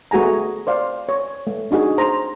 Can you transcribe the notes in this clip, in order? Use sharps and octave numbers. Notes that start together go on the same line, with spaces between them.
A3 F#4 G#4 G#5 A#5
C5 D5 F5
C#5
A3
D4 D#4 F#4 G#4
C5 A#5